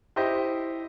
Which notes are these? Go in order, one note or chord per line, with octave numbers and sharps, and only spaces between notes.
E4 G4 C5 D#5